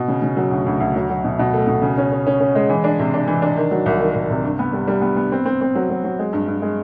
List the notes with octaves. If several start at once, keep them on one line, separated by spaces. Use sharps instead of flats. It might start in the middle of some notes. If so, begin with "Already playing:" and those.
Already playing: B2
C#3
C#3
F#3
D2
D2
D2
F#3
F#3
B2
B2
A3
B2
C#3
C#4
C#4
C#4
C#4
G#3
E3
D4
C3
D4
E3
D4
D#3
F#3
C2
D#3
C2
C3
G2
B3
G3
G3
B3
B3
C4
C4
C4
F#3
F#3
F#3
G#3
G2
G2
G#3